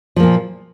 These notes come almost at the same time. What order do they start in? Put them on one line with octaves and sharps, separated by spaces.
F3 A#3 A#2